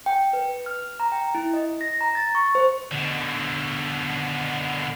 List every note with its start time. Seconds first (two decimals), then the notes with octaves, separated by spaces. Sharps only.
0.06 G5
0.33 B4
0.66 F6
1.00 A#5
1.12 G5
1.35 E4
1.54 D#5
1.81 A#6
2.01 A#5
2.15 A6
2.35 C#6
2.55 C5
2.92 B2 D3